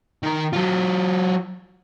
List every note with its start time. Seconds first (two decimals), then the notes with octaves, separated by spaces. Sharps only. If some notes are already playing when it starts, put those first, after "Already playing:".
0.23 D#3 A#4
0.53 F#3 F4